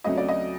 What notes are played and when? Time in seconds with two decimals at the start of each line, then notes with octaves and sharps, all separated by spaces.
0.04 D2 C#3 F#3 A3 C4 D#5
0.17 D5
0.28 D#5